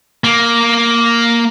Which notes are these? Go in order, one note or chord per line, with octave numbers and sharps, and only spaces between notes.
A#3